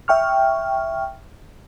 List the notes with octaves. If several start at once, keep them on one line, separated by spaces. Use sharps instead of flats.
E5 G5 C#6 F6